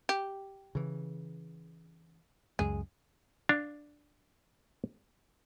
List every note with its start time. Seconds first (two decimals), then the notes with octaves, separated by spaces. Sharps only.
0.09 G4
0.75 C#3 E3
2.59 C#2 F#2 G#3 G#4
3.49 D4 F5